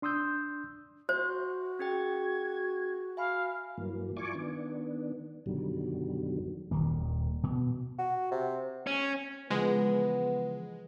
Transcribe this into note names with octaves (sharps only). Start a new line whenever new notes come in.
D4 C6 D#6 E6 G6
F#4 C5 E5 C6 G6
C#4 G#4 G5 G#6
E5 F5 G#5 B5
G2 E3 F#3 A#3
E4 F4 D5 G#5 C#6 D6
D#3 B3 D4
F#2 B2 D3 D#3 F#3 G3
D#1 D#3 A#3
B2
F#4
C3
C#4
C#3 E3 F3 G#3 B3